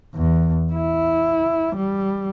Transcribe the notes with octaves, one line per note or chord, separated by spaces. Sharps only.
E2
E4
G3